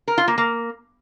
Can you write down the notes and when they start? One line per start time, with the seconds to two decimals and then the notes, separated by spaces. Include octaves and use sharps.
0.08 A#4
0.18 F4
0.28 A#3
0.38 A#3